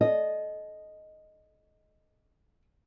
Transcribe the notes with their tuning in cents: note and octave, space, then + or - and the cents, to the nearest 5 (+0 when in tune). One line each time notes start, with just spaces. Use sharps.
A4 -30 D#5 +0